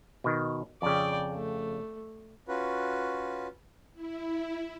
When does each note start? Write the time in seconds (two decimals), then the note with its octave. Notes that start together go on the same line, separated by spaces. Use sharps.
0.24 B2 D#3
0.82 F2 C#3 D5 G5
1.34 A3
2.48 C#4 F4 F#4 B4
3.94 E4